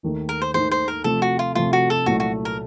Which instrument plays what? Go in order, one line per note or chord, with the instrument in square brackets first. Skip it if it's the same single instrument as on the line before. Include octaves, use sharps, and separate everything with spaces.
[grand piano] D#2 D#3 A3 D#4
[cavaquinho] A#4
C5
[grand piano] D#2 D#3 A3 D#4 [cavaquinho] C5
[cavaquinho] C5
A#4
[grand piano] C3 F3 A3 [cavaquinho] A4
[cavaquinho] F#4
F4
[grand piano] C3 F3 A3 [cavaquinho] F4
[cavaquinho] F#4
A4
[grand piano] C2 A#2 F#3 A3 [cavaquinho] F#4
[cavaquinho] F#4
A#4